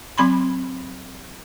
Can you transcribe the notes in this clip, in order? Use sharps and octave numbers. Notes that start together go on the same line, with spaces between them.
F#3 C4 B5 C6